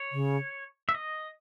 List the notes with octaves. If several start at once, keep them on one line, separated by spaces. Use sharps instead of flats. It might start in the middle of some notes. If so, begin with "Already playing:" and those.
Already playing: C#5
C#3
E5
D#5